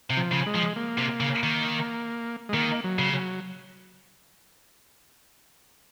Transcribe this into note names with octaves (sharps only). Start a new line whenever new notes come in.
C3
F3
C#3
G#3
F3
A#3
C3
C#3
D#3
G#3
D#3 A#3
F#3
C#3
F#3